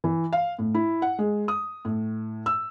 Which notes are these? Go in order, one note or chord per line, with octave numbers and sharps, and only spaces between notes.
E3
F5
A2
E4
F#5
G#3
D#6
A2
E6